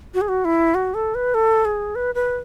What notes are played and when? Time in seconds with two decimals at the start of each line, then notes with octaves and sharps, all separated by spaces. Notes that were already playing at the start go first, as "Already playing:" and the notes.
0.14 F#4
0.21 G#4
0.28 F#4
0.45 E4
0.75 F#4
0.94 A4
1.15 B4
1.34 A4
1.65 G#4
1.95 B4
2.15 B4